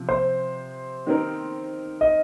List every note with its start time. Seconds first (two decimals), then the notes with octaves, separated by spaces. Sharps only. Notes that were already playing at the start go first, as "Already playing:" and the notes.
Already playing: C3 F3
0.09 C5
1.07 D#3 C4 D#4 A#4
2.01 D#5